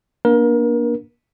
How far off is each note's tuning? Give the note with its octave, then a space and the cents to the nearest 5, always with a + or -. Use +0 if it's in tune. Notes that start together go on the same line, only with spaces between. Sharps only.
A#3 +30 D4 +0 A#4 +30